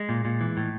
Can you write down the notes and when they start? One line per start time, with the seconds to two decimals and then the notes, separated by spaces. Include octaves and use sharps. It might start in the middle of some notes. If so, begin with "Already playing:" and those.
Already playing: G#3
0.09 A#2
0.25 A#2
0.41 E3
0.57 A2